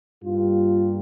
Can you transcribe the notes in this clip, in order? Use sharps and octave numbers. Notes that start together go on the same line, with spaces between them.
G2 G3 A#3 F4